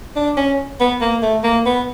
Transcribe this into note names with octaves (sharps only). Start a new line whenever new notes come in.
D4
C#4
B3
A#3
A3
A#3
B3